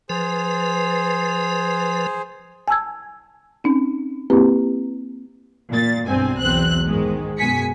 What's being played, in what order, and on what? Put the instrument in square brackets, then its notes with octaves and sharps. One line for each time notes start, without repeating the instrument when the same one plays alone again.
[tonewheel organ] F3 B4 [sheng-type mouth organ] G#4 C5
[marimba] G#5 A5 E6 G#6
C4 C#4 D#4
A#3 C4 E4 G4 B4
[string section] A#2 A6
B1 G2 C4 G#5
B1 E2 C4 F#6
G#2 D#3 G#3
F#2 B2 G#3 G#5 B6 C#7